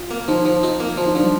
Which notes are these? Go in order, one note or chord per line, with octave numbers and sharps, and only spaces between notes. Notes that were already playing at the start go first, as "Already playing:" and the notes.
Already playing: F4
A#3
F3 D#4
F3
D#4 F4
A#3
F3 F4
D#4
F3 D4
G3